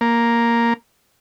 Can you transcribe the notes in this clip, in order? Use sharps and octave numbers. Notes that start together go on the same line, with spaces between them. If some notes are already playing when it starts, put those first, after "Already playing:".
A#3